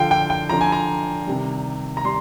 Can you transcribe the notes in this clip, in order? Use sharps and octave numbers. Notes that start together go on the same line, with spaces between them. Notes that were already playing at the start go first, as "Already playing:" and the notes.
Already playing: D3 F3 F5 G5
G5
G5
D3 F3 A#5
G#5
A#5
C3 D#3 G3
A#5
G3 C6